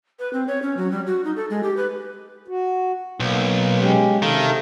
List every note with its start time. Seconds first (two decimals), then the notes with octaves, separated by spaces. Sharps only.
0.19 B4
0.33 C4
0.48 C#5
0.62 C#4
0.77 F#3
0.92 G3
1.06 F#4
1.25 D#4
1.36 A4
1.50 G#3
1.63 G4
1.77 B4
2.48 F#4
3.20 B1 A#3
3.79 G#3 C#4 G4
4.22 C3 D#3 A4 F5